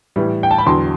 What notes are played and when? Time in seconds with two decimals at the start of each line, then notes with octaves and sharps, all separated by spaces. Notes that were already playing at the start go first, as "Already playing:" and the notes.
0.16 A2 E3 G3
0.43 G5
0.51 A5
0.58 B5
0.67 E2 D3 F#3 C6